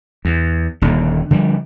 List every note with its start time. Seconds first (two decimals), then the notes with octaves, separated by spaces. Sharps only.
0.25 E2
0.81 D#1 D#2 D3
1.31 D3 F3 G3